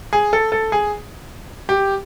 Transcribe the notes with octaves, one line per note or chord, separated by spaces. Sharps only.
G#4
A4
A4
G#4
G4